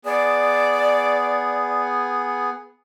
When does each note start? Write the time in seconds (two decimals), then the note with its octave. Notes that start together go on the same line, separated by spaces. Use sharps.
0.05 B3 G#4 D5